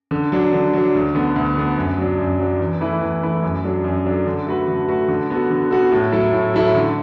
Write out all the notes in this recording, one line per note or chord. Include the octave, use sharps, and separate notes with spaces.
D3
F#3 D4
D3
F#3 D4
D2
D3 B3
D2
D3 B3
F#2
F#3 D4
F#2
F#3 D4
E2
E3 A3 E4 B4
E2
E3 A3 E4 B4
F#2
F#3 D4 A4
F#2
F#3 D4 A4
D3
A3 F#4 B4
D3
A3 F#4 B4
D3
B3 F#4 A4
D3
B3 F#4 A4
A2
F#3 A3 E4 A4
A2
F#3 A3 E4 A4
D3